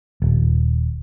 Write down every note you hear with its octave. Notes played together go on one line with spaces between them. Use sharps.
D#1